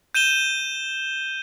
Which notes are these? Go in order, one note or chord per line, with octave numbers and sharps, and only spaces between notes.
G6 D#7 E7 G7